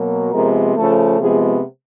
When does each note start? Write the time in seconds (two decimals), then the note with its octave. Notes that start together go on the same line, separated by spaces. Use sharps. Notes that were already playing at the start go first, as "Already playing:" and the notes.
Already playing: B2 F#3 A#3
0.32 C3 F3 G#3 B3 A#4
0.75 C#3 F3 A3 A4
1.19 C3 F3 G#3 B3 G#4